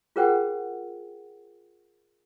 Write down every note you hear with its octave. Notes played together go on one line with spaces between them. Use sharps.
F4 G#4 A#4 C5 F#5 G5